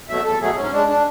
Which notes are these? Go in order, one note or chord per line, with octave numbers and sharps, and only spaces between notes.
B2 F#3 A3 E5
E2 A4
B2 F#3 A3 G#4
G#2 C#4
G#3 D4
D4